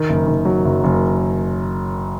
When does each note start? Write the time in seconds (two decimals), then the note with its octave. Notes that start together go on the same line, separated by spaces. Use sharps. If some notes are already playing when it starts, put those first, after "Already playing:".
Already playing: D#3
0.09 F#1
0.27 D#3
0.45 F#3
0.65 F#1
0.84 F#1